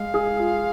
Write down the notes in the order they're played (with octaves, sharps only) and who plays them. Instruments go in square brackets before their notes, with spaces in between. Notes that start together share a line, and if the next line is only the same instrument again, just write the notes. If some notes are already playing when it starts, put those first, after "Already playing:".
Already playing: [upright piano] G#3 [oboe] F5
[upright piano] G#4
F4